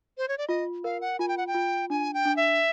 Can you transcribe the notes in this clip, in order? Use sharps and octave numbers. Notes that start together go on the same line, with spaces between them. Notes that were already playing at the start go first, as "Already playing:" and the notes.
C5
C#5
D5
F4 D#5
A#4 F5
F#5
F4 G#5
G5
F#5
G5
F4
D4 G#5
G5
D4
E5